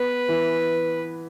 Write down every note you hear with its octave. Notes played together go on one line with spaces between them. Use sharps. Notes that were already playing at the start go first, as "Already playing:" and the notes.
Already playing: B3 B4
E3